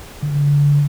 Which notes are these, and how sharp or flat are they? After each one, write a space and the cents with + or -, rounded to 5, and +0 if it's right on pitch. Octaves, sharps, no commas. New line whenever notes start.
D3 -30